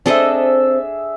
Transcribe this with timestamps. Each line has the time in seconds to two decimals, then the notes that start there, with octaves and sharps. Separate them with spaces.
0.06 C4 D4 G#4 A4 C5 D#5 E5